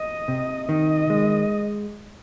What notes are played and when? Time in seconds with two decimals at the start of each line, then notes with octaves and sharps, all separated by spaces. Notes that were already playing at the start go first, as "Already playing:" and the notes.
Already playing: D#5
0.28 C3
0.69 D#3 D#5
1.10 G#3